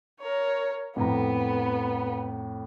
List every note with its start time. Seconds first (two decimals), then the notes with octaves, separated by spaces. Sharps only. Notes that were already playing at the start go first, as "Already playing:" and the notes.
0.20 A#4 C#5
0.96 F2 A2 B3 A#5